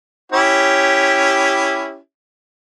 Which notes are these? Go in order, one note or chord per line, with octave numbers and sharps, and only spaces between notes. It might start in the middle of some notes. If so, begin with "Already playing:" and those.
C#4 E4 G4